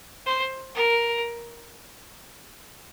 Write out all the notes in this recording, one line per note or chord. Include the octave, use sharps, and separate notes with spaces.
C5
A#4